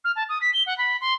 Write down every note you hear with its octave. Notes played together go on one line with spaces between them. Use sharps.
F6
A5
D#6
B6
G7
F#5
B5
C6